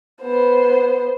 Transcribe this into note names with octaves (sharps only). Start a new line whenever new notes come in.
B3 C5